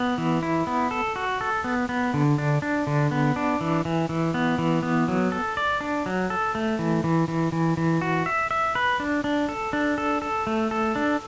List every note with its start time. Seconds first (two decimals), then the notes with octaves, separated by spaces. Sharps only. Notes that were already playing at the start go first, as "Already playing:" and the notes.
Already playing: B3
0.18 E3
0.43 E4
0.67 B3
0.91 A4
1.16 F#4
1.41 A4
1.64 B3
1.89 B3
2.14 D3
2.38 D4
2.62 D4
2.87 D3
3.11 B3
3.36 D4
3.61 E3
3.85 E3
4.09 E3
4.34 B3
4.59 E3
4.83 B3
5.08 F#3
5.32 A4
5.57 D5
5.81 D4
6.06 F#3
6.30 A4
6.55 A3
6.79 E3
7.04 E3
7.28 E3
7.52 E3
7.77 E3
8.01 F#4
8.26 E5
8.51 E5
8.75 B4
9.00 D4
9.24 D4
9.49 A4
9.73 D4
9.98 A4
10.22 A4
10.47 A3
10.71 A4
10.96 D4